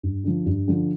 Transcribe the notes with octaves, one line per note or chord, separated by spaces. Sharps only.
G2
D3 F3
G2
D3 F3